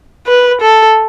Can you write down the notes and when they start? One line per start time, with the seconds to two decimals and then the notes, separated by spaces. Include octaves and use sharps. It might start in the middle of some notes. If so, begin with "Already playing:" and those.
0.27 B4
0.61 A4